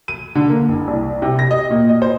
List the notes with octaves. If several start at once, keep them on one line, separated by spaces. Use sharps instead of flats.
D#7
D3
A#3
F#1
C2
C3
A#6
D#5
A#2
D#5
C5